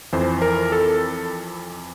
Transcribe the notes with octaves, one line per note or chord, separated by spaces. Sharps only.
F2 E3 C5
A#4
A4